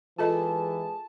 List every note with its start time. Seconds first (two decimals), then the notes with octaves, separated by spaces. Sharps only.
0.18 E3 G#3 F4 G#4 A4 B4 D#5 A5